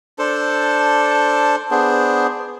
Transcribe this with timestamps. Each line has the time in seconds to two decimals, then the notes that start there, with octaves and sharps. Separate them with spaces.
0.19 D4 A4 C5 A5
1.71 B3 D4 G#4 C5